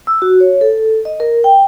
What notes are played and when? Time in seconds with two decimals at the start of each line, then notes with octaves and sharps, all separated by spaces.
0.07 E6
0.22 F#4
0.40 C#5
0.61 A4
1.05 D#5
1.20 A#4
1.44 G5